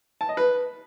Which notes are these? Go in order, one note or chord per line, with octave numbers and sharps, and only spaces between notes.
A5
D#5
B4